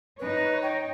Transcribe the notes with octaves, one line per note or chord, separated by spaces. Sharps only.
D#4 B4 C#5
G5